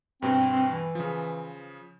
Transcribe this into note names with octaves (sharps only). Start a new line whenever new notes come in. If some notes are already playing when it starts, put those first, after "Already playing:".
G2 B2 C4
C4
E3
C#3 F3